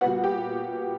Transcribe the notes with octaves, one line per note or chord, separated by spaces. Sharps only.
A#2 G3 B3 F#4 F#5
G4 G5